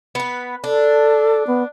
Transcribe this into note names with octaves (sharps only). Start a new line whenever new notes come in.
B3 B4
D4 A4
B3